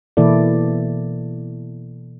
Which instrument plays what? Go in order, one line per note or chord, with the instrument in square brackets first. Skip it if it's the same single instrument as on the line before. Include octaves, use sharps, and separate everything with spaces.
[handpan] B2 E3 A#3 E4 A4 D5